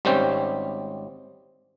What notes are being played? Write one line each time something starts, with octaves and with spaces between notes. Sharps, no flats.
G#1 G3 C4 C#4 G5